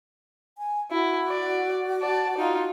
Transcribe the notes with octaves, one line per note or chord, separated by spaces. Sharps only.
G#5
E4 F#4
D5
D5 A5
D#4 F4 F#4